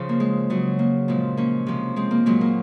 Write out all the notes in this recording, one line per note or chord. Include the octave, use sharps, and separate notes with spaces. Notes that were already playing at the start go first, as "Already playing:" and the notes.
Already playing: C#3 F3
A#3
G#3
C#3 F#3
A#3
A#2 F3 G#3
A#3 C#4
C3 F3 G#3
G#3 C4
A#3
A#2 F#3 G#3
A#3